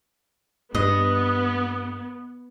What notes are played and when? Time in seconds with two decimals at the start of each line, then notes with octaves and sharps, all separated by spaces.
0.75 G2 B3 D#5